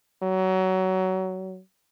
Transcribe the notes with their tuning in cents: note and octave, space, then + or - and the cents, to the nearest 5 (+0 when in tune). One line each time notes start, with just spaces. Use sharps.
F#3 +20